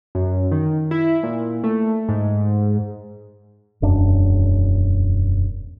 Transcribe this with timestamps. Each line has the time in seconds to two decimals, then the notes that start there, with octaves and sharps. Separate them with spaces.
0.15 F#2
0.51 D#3
0.91 E4
1.23 A#2
1.64 A3
2.09 G#2
3.82 E1 F#2 D4